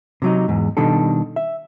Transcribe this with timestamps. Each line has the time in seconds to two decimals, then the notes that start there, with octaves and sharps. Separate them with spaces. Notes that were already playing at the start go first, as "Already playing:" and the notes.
0.22 C3 F#3 D#4
0.48 E2 G#2
0.77 B2 D#3 G3 D4 A4
1.36 E5